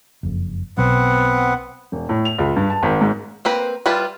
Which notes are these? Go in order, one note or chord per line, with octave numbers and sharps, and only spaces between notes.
F#1 F2
B1 B2 F#3 B3 C4 F#5
E1
A2
F7
C#2
G2
A5
G#1
G#2
A#3 C4 B4
G3 E4 F4 B4 A5